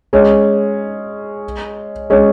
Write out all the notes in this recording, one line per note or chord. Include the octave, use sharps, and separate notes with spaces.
G#3 C#4
G#3 C#4